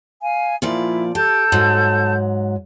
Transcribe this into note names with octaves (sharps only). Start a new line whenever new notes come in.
F5 G#5
A#2 F3 E4 D5
G4 A4 A5 G6
G#2 F#3